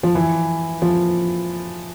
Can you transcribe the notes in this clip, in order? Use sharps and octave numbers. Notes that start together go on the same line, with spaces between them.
F3
E3
F3